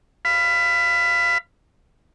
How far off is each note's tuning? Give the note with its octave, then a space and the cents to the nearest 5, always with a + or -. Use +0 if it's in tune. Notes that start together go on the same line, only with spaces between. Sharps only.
F5 -15 B5 +15